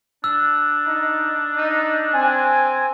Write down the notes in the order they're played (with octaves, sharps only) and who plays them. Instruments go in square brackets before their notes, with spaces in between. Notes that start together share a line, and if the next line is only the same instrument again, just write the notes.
[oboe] D4 [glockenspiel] E6
[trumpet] D#4
D#4
[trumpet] C4 [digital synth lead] G#5